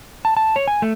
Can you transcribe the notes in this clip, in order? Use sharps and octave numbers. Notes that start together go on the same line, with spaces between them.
A5
A5
C#5
G#5
A3